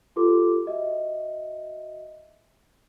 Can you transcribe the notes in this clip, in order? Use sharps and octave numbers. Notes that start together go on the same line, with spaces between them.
F4 G4 A4 B4 C6 D6
F#4 D#5 E5